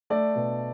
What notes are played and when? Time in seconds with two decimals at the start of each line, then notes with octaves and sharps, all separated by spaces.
0.10 A3 D5
0.35 B2